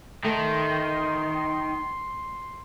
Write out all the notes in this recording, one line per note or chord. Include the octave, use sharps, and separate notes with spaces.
D#3 A3 C6